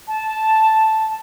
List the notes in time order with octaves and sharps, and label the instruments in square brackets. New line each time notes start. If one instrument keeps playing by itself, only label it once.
[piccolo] A5